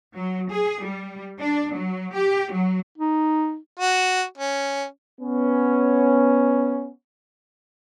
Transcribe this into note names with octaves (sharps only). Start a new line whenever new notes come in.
F#3
G#4
G3
D4
F#3
G4
F#3
D#4
F#4
C#4
B3 C#4